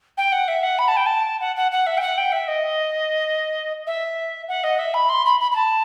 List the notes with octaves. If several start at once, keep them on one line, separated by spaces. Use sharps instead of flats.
G5
F#5
E5
F#5
B5
A5
G5
A5
F#5
F#5
F#5
E5
G5
F#5
G5
E5
D#5
E5
F#5
D#5
E5
B5
C6
B5
B5
B5
A5